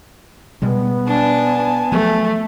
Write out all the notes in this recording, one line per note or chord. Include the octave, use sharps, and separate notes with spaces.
B2 G3 G#3 B3
D4 G#5 A5
F3 F#3 A3